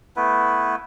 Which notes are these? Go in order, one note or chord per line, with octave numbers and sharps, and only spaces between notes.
A3 B3 E4 B4